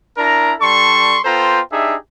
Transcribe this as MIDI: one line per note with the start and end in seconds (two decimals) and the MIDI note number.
0.17 0.53 62
0.17 0.53 64
0.17 0.53 70
0.17 0.53 82
0.60 1.18 55
0.60 1.18 62
0.60 1.18 69
0.60 1.18 84
0.60 1.18 85
1.25 1.59 59
1.25 1.59 65
1.25 1.59 69
1.25 1.59 72
1.25 1.59 79
1.25 1.59 82
1.71 1.95 62
1.71 1.95 63
1.71 1.95 67
1.71 1.95 68
1.71 1.95 76